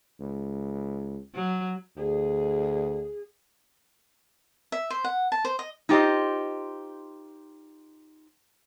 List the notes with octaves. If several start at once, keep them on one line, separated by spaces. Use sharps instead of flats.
C#2
F#3
D2 G#4
E5
C5
F#5
A5
C5
D#5
D#4 F4 G4 C5 D#5